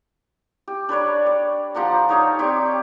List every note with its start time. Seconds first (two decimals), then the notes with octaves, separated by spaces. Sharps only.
0.68 G4
0.89 D4 B4 C#5 D5
1.26 D5
1.75 F3 G4 F#5 A#5
2.09 D#4 C#5 D#5 F5
2.39 C4 G4 C#5 D5